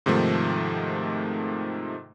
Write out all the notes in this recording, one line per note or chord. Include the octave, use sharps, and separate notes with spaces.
G#2 C3 D#3 F3 A3